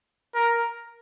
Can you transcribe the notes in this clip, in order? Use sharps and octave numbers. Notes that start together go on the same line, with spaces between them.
A#4